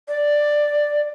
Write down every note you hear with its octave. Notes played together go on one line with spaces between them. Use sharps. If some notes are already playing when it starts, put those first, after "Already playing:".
D5